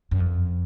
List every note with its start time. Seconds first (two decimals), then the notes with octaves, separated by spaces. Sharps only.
0.11 F#2
0.20 F2